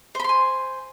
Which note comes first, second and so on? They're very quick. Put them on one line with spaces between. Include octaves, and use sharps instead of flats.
C5 B5 C6 G#5